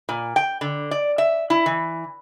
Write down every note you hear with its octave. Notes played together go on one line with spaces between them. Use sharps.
A#2
G5
D3
D5
E5
E4
E3